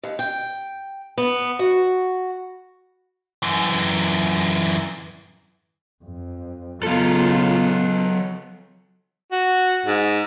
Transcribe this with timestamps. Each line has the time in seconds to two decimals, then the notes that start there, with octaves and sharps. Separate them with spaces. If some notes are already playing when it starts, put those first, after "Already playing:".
0.03 D#2
0.19 G5
1.18 B3
1.59 F#4
3.42 F#2 E3
6.04 F2
6.83 C#3 F#3 B3 F4 A4
9.32 F#4
9.86 G#2